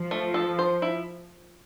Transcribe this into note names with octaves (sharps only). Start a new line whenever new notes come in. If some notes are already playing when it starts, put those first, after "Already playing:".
Already playing: F3
A3
A4
C5
E4